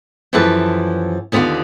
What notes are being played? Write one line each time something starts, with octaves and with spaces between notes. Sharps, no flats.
F#2 E3 F3 G4 A4 B4
D#2 D3 B3 F4 G4 F5